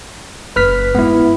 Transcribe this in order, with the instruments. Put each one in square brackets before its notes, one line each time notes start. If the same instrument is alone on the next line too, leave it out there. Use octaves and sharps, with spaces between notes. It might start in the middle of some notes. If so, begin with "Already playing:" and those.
[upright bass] F#1 [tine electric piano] B4 F6 B6
[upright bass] G#2 [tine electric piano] B3 E4